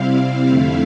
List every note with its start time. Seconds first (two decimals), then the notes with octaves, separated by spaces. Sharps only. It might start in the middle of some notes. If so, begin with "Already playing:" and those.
Already playing: C3 G3 C4 E4 F5
0.48 F2 D3 A3 E4